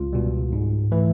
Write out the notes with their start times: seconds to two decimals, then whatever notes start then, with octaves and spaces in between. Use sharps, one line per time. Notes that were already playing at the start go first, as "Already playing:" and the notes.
Already playing: C#2 F4
0.13 B2 G3
0.52 G#2
0.92 E3 A3